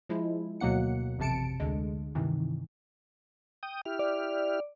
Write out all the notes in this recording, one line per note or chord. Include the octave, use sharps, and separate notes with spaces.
F3 G#3 E4
D2 B2 F#3 A#3 F#5 C#7
A1 F2 C3 A5 C#7 D7
D2 D3 G#3
G2 C3 D#3 E3
G5 D#6
E4 G4 F6
D5